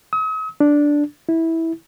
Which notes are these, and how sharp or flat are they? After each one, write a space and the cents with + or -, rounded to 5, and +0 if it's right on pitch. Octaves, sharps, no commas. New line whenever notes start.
D#6 +45
D4 -5
E4 -15